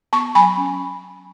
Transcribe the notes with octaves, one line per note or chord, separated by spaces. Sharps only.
B3 A5 C#6
F#3 G#5 B5
C#4